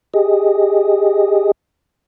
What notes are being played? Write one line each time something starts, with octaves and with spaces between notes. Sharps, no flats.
G4 G#4 D#5